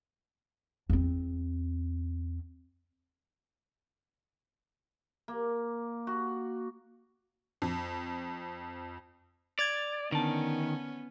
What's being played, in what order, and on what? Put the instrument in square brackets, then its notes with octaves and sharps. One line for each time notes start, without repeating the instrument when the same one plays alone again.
[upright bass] E2 C4
[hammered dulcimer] A#3
F#4
[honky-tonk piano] F2
[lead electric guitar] D5 [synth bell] G#6 A6 F7
[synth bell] D3 A5 [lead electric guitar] D#3 [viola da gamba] B3 C#4